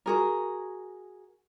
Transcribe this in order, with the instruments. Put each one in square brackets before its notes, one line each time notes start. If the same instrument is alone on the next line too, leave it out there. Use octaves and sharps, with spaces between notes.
[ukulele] F#4 G#4 A#4